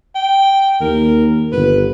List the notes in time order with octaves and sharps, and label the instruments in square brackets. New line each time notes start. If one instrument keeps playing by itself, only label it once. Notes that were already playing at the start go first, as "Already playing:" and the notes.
[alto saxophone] G5
[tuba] D#2 [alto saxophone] A#4
[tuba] G1 [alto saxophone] B4